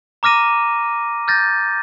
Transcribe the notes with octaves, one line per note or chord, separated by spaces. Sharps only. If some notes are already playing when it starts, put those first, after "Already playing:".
A#5 D6 F6 A#6 D#7
F6 G6 A6 A#6